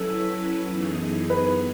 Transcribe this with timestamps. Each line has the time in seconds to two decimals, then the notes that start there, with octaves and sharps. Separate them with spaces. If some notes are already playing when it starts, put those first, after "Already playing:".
Already playing: F#3 C#4 E4 A4 B4
0.69 F#2 E3 B3 D#4 G#4
1.30 B4